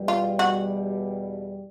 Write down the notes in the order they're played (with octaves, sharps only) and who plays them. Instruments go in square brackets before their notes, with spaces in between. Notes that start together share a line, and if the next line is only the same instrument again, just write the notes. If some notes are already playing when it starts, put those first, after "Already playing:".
Already playing: [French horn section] E2 B2 G3
[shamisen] F4
F#4